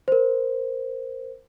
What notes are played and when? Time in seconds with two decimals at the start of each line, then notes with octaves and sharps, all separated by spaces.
0.08 A#4 C5